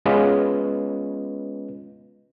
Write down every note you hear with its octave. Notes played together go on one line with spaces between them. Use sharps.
G#3 B3 C#4 F4 B4 D#5